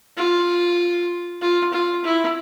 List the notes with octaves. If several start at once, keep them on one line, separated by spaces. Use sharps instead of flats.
F4
F4
F4
E4